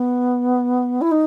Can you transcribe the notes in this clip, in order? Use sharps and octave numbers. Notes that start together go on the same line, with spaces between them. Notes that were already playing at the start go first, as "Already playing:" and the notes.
Already playing: B3
E4
D#4